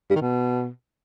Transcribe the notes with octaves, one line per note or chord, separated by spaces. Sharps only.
G2
D#3
B2